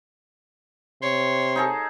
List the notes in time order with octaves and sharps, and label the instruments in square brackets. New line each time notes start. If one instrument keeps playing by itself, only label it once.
[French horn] C3 [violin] C#5 [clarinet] C6
[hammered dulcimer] D#4 G#4 A4